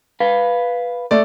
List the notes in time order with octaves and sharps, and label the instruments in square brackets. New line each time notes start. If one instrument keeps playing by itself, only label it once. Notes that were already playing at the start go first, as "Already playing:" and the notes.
[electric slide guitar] B4 F5
[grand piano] A3 D5